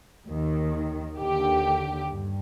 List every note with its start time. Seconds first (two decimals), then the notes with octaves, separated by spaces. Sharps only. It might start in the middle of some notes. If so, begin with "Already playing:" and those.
0.27 D#2 D#3
1.19 D#2 D3 G4
2.10 G2